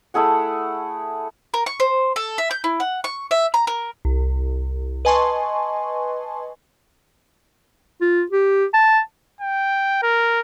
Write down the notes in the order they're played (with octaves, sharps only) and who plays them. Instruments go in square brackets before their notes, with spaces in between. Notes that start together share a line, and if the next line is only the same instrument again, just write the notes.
[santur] A3 E4 G#4 F#5
[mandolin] A#4
C#6
C5
A4
E5
G6
E4
F#5
C#6
E5
A#5
A#4
[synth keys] C2
B4 D#5 G#5 A5 C6 C#6
[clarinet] F4
G4
A5
[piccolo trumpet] G5
A#4